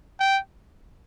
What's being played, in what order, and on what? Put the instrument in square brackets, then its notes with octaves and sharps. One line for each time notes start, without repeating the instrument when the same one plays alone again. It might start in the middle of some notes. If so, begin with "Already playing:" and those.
[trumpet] G5